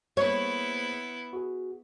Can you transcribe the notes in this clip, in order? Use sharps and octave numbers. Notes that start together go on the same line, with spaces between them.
A#3 B3 E4 G#4 C5 C#5
F#4 G#4